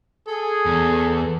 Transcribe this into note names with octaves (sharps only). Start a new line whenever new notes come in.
G#4 A4
E2